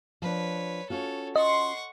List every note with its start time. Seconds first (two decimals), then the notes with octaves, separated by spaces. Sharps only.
0.22 F3 D4 B4 C#5
0.90 C#4 F4 F#4 A4 C#5
1.36 D#5 F#5 C6 C#6